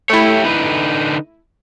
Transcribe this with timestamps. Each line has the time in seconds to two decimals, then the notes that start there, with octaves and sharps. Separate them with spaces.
0.09 A3 E4 G4 C#5
0.44 D3 D#4 B4